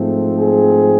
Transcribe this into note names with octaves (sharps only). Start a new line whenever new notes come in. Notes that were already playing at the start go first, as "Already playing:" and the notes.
Already playing: G#2 F3 A3 C4
G#4